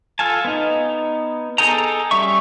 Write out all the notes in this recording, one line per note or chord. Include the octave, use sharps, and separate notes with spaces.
F4 A4 F5 G#5 A5
B3 D#4
G#4 A4 D#5 G5 A#5
G3 C#4 E5 C#6